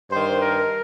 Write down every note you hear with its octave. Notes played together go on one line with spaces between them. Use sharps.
G2 D#3 C5
A#4